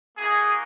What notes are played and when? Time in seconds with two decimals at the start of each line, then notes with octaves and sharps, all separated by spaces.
0.18 A#3 D#4 F#4 G#4